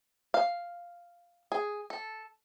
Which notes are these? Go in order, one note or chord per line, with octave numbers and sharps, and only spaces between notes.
F5
G#4
A4